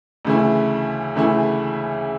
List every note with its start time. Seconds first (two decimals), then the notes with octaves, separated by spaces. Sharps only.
0.25 D2 C#3 E3 A3 E4
1.15 D2 C#3 E3 A3 E4